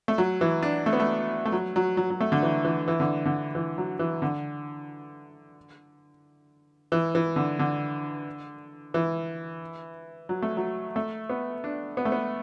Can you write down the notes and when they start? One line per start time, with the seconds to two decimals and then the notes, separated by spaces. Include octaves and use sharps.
0.08 A3
0.18 F#3
0.41 E3
0.63 D4
0.86 A3
0.93 B3
1.00 A3
1.45 A3
1.52 F#3
1.76 F#3
1.97 F#3
2.10 F#3
2.21 A3
2.32 D3
2.43 E3
2.65 E3
2.88 E3
3.00 D3
3.25 D3
3.55 E3
3.78 F#3
3.99 E3
4.22 D3
6.92 E3
7.15 E3
7.36 D3
7.59 D3
8.94 E3
10.29 F#3
10.42 A3
10.57 F#3
10.96 A3
11.29 B3
11.64 D4
11.97 B3
12.05 A3
12.12 B3